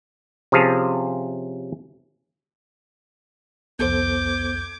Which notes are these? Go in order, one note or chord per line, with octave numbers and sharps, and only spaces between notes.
C3 F3 C#4 G#4 F5 A5
C2 F2 B3 A4 C5 D6 G6 G#6